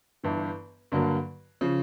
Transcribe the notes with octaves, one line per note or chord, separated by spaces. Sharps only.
G1 G2 E3
G2 D3 F#3 A#3
C#3 F3